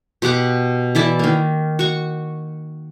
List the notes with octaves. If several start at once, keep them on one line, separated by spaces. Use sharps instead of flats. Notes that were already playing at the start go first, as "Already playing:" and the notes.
B2 G4 F#5 D6
E3 E4 D5 A5
D#3 A#3
F#4 C#6